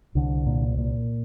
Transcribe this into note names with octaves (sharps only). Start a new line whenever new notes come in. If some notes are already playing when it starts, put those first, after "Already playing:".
C2 D3
A#2
A#2